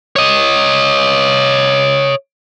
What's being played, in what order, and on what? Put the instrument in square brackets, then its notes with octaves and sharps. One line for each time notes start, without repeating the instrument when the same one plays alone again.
[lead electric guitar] C#5 D#5